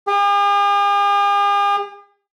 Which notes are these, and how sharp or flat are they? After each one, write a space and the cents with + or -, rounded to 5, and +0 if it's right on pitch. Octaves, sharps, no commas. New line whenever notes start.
G#4 -45